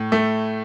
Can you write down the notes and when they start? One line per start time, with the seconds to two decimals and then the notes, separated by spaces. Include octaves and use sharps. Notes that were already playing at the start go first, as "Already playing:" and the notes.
Already playing: A2
0.12 A3